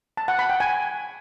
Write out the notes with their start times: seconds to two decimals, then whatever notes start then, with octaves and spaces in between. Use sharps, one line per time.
0.17 A5
0.28 F#5
0.39 B5
0.50 G5
0.60 G#5